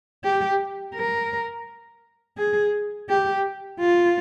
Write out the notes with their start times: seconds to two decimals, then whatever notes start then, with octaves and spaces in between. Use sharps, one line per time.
0.24 G4
0.95 A#4
2.38 G#4
3.09 G4
3.80 F4